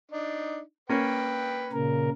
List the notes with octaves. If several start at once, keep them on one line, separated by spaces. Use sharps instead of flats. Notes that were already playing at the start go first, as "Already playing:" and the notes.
D4 D#4
A#3 C#4 B4 G5
A#2 C#3 A#4